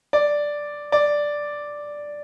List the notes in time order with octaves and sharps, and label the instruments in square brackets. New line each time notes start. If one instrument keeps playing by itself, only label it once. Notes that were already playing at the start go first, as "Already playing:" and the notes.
[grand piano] D5
D5